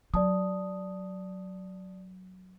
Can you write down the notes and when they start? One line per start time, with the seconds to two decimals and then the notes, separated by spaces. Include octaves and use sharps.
0.14 F#3 D5 A5 D#6